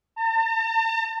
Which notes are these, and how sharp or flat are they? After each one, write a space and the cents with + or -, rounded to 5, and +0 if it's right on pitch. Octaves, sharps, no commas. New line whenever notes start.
A5 +45